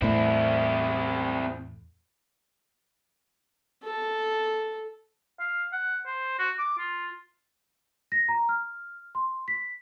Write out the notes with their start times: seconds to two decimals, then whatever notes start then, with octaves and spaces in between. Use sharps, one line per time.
0.02 E2 A2 A3 C4 E4
3.84 A4
5.40 F5
5.72 F#5
6.06 C5
6.39 F#4
6.58 D6
6.78 F4
8.12 A#6
8.29 A#5
8.49 F6
9.15 C6
9.48 B6